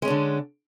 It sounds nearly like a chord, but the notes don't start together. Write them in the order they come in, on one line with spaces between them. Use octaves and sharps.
G#3 C#4 D4 D3